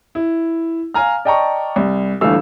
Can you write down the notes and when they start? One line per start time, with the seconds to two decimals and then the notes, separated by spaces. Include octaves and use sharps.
0.15 E4
0.94 F5 G#5 A#5 F6
1.25 D5 D#5 G5 A5 A#5 C#6
1.76 C2
2.21 D#1 D3 E3 A3 F5 E6